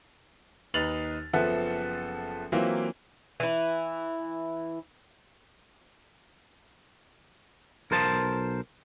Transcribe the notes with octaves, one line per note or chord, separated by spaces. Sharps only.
D#2 D#4 B4 A6 F7 F#7
F#1 F3 B3 A4 E5 F#5
E3 F#3 A#3 C4 E4 F4
E3 E4
B1 A#4 C5 A5